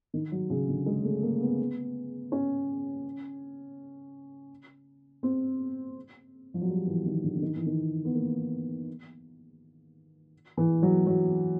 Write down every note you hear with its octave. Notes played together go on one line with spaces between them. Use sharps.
D#3
F#3
C#3
D3
G#3
A3
A#3
B3
C#4
C4
F3
F#3
G3
E3
D#3
D3
D3
D#3
E3
D#3
B3
A#3
E3
F#3
F#3